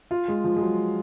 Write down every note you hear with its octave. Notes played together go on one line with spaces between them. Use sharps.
F4
G#3
F3
G#3
F#3